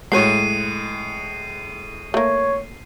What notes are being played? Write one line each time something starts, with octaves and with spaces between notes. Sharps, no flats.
A2 F#3 G#3 B4 C#5 C7 D#7
A3 A#3 C#5